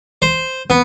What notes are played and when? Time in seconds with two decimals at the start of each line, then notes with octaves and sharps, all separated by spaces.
0.22 C5
0.70 B3